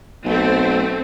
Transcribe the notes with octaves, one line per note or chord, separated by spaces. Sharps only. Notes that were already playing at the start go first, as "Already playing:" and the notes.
B1 A3 C4